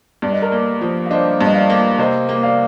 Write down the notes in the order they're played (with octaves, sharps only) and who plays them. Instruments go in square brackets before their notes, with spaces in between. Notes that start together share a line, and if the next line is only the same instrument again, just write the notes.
[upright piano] G2 [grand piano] D5
[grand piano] D#5
A#4 D5
[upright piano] A#3
F3
[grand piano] F5
[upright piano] D4 [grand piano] C5 D#5
[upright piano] G2
[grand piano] D#5
D5 F5
[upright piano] A#3
[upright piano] C3 [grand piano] C5 D#5
[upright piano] A#3
[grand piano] D5 F5